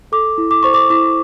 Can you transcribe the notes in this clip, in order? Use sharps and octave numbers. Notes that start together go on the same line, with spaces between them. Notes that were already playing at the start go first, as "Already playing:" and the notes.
A4 D6
E4
D6
C5 C#6
D6
E4 D6